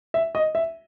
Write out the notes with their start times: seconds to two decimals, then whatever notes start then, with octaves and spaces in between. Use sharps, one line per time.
0.14 E5
0.35 D#5
0.55 E5